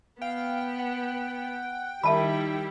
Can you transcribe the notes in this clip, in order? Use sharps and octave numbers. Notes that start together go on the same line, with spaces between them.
B3 F5 G5
F#5
D#3 G3 E4 E5 A5 B5